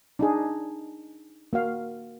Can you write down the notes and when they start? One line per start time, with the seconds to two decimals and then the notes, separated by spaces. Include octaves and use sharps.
0.19 D4 D#4 G#4
1.53 A#3 F#4 F5